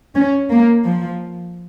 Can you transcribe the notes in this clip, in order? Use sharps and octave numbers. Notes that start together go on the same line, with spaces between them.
C#4
A#3
F3